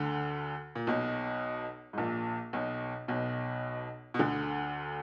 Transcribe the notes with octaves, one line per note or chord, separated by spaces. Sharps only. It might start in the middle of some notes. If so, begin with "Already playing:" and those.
Already playing: D2 D3
A#2
B1 B2
G#2
A#1 A#2
B1 B2
B1 B2
B2
D2 D3